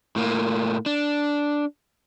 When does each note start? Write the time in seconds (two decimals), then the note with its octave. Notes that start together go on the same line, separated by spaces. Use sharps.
0.16 A2 A#3
0.86 D4